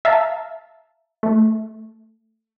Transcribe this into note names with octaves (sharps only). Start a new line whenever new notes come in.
E5 F5 A5 A#5
A3